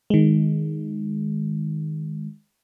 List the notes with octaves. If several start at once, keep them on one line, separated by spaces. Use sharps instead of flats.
D#3 G#3